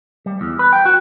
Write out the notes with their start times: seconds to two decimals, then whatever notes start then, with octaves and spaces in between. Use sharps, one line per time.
0.26 G3
0.41 E2
0.59 B4
0.73 G5
0.85 F#4